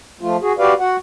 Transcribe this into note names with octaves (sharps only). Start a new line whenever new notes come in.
F3 A3 F4
F#4 G#4
F#4 G4 B4 D5 F5
F#4 F#5